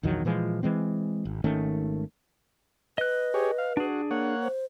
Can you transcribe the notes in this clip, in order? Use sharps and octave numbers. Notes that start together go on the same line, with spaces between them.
A#1 E2 D#3 F#3
A#2 E3 F3 G#3
E3 G#3 C4
G#1
G#1 D#3 A3 C#4
B4 D#5 F#6
G4 G#4 C#5
F5
D4 F#4 G#4
A#3 C#5 F#5
C5